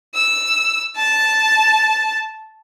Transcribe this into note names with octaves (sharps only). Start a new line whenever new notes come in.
E6
A5